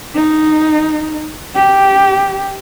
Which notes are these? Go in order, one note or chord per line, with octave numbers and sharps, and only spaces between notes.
D#4
G4